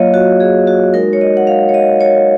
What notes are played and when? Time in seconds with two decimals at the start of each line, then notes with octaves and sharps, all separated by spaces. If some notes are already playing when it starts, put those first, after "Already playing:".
Already playing: F#3 A#3 F4 C#5 D#5 F5
0.14 F#4
0.40 G#4
0.67 F#4
0.94 G#3 D#4 F#4 A#4
1.13 C#5
1.21 D#5
1.37 F#5
1.47 F5
1.69 C#5
1.74 D#5
2.01 C#5